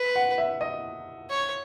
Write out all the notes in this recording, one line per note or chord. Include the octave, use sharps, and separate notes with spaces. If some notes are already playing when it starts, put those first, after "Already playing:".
Already playing: B4
F#5
E5
D#5
C#5